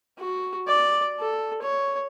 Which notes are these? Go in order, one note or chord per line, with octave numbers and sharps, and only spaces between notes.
F#4
D5
A4
C#5